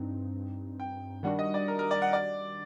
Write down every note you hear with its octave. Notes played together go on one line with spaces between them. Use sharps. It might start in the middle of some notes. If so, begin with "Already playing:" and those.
Already playing: G2 C4 D#4
G5
D#3 G3 D4 F#4 F#5
D#5
D5
A#4
A#4
D5
F#5
D5